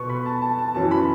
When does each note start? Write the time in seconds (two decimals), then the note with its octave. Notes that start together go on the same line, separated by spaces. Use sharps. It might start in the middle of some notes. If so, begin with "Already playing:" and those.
Already playing: B2 B3 C#6
0.09 B5
0.26 A5
0.42 A5
0.59 A5
0.74 F#2 E3 C#4 A5
0.91 B5